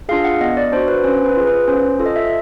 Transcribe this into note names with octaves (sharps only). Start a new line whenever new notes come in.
D4 F4 G#4 F5
F#5
B3 D#5
D5
D4 F#4 C5
B4
C#4 C5
B4
F4 G#4
B4
C#4 C5
F4 A4
D#5
E5